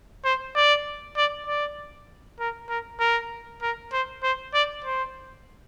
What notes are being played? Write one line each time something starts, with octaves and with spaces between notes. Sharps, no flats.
C5
D5
D5
D5
A#4
A#4
A#4
A#4
C5
C5
D5
C5